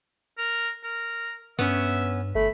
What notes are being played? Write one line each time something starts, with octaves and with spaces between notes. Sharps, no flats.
A#4
A#4
G2 B3 C#4 E5
G1 A3 B5